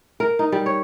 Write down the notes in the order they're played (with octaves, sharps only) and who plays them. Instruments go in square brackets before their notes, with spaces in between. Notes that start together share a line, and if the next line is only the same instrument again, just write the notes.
[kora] A#4
D#4
G3
C#5